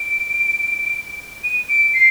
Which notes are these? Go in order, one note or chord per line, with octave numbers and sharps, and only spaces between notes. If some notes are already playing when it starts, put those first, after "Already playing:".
Already playing: D7
D#7
D7
C7